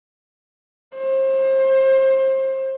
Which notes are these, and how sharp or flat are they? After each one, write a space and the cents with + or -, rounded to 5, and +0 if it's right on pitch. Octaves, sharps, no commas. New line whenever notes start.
C5 +30